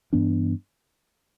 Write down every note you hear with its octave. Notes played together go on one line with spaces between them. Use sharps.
G2 E3 B3 D4